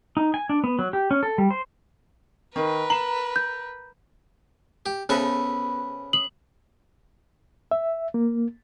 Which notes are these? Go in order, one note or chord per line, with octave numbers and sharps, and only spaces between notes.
D#4
G#5
D4
B3
F#3
G4
C#4
A4
G3
C5
D#3 A#4 B4
A#5 E7 F#7
G6
G4
C#3 B3 A4 B4 C5 E5
D#6 F#7
E5
A#3